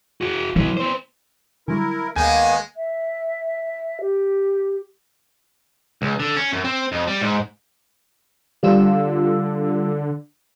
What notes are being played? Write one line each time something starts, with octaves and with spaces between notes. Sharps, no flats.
F#4 G#4
F#3 B3 E4
B3 C5
D3 F#3 G3 E4 A#4
D2 D#3 G#3 A#3 B3 G#5 G6
E5
G4
C#2
D3
C#4
F#2
C4
F2
G3
G#2
D3 G3 F4 E6